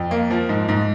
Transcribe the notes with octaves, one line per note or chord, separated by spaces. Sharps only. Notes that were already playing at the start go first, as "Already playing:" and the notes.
Already playing: F2
A#3
F3
G#2
G#2